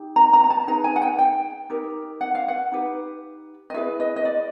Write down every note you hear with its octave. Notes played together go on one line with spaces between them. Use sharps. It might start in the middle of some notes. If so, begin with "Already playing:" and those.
Already playing: D#4 G4
A#5
A#5
A#5
A5
D#4 G#4 B4 A#5
G#5
F#5
G5
G5
D#4 G4 A#4
F#5
F5
F#5
D#4 G4 B4
D#5
E4 G#4 B4 E5
D#5
D#5
D5